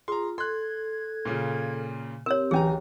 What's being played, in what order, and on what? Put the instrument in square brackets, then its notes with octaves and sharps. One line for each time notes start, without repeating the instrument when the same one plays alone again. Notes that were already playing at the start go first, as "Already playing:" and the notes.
[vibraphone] F4 [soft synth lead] G#4 [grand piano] A#5 C6
[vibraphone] A4 [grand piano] C6 F#6 [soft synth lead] G#6
[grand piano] A#2 C#3 F4
[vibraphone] C4 G4 [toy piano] A#4 C#5
[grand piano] D1 G#5 A#5 [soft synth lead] E3 [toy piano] C#4 G#4 [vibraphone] G4